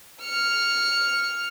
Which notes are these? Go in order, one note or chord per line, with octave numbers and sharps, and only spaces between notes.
F6 C#7